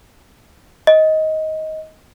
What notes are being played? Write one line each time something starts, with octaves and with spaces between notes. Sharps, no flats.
D#5